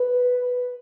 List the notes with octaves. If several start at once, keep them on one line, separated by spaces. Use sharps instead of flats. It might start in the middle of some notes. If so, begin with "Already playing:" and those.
Already playing: B4